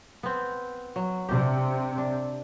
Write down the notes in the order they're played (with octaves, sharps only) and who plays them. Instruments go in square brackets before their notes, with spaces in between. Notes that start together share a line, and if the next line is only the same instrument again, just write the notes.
[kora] B3 C4
F#3
[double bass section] C3 [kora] D4 G4
[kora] D4